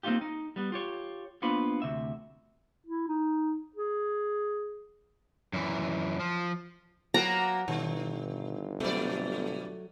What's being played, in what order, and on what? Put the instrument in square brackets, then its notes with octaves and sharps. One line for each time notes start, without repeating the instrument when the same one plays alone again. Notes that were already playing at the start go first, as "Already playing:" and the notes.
[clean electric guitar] A#3 C4 C#4 D#4 F4 G4
D#4
G3 B3
F4 G4 C#5
A#3 B3 D4 F4 C5 B5
D2 C3 E5
[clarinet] E4
D#4
G#4
[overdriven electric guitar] F#2 E3
F3
[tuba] F#3 [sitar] A#3 B3 F#4 [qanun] A#5
[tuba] G1 [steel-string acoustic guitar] B2 C#5 [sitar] D#3
[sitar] B2 D5 [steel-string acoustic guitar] F#3 A3